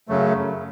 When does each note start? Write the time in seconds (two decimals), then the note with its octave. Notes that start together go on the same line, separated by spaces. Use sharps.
0.08 F#2 C#3 F#3 A3